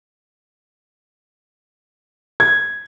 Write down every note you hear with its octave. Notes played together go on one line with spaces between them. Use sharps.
G#6